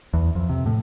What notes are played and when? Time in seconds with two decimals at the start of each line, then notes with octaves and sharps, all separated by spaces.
0.14 E2
0.35 F2
0.49 C3
0.66 A2